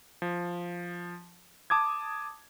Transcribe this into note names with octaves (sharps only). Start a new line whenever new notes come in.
F3
A5 D6 D#6 G#6